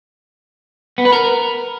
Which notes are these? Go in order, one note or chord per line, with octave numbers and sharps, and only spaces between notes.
B3
B4
A#4